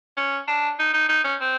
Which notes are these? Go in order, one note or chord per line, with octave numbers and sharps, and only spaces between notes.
C#4
D4
D#4
D#4
D#4
C#4
C4